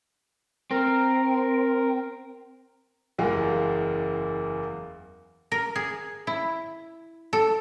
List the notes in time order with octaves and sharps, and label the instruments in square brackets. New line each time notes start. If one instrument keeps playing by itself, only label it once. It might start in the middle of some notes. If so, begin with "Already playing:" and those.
[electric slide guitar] C4 [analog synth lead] A#4
[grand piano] F#1 E2 G#3 F5
[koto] A#4
G#4
E4
A4